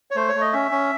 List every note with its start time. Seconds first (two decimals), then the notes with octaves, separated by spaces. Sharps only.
0.11 C#5
0.16 A3 C5
0.28 C#5
0.35 A3
0.41 D#5
0.53 C#4 E5
0.71 C#4